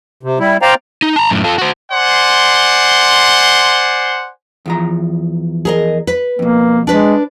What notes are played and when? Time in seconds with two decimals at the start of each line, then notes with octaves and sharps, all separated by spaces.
0.23 C3
0.40 G3 E4
0.62 C5 D5 F5 G5 A#5
1.02 D#4
1.16 A5 A#5
1.30 F#2 A2
1.44 F4 A4
1.58 F#4 C5
1.92 C5 D5 F#5 G#5 C6
4.66 E2 F3 A#5
5.65 G#4 A#4 D#5
6.07 B4
6.39 F2 B2 A#3
6.87 G#3 D4 B4